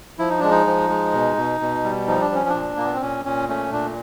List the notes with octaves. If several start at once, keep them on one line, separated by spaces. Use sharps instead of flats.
F3 E4
D#4
G#3 D4
D#4
F3
G#3
B2
B2
B2
G3
F3 D#4
D4
F3 C#4
D4
A#2
A#2 A#3
B3
C4
A#2 C#4
A#2 C#4
A3 C#4
A#2 D4